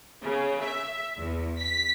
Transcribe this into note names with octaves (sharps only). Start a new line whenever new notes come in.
C#3
E5
E2
B6